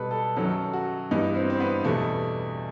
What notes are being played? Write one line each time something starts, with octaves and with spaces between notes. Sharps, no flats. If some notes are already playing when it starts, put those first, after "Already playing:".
Already playing: B2 G3 A4 B4
A4
F#2 D#3 F#3 A4
F#4
G2 E3 G3 D#4
C4
C4
B3
E2 B2 G3 A3